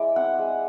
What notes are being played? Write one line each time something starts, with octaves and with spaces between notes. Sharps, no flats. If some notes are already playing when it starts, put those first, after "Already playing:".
Already playing: G#3 E4 D5
C4 F#5
G#3